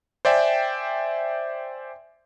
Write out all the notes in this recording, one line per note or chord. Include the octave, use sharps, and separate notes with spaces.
C5 D5 E5 G5 G#5